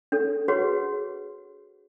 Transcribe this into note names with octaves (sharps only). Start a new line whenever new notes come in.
D4 A4
F#4 G#4 B4 C#5 F#5